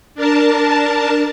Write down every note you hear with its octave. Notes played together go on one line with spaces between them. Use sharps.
D4 A#4 A5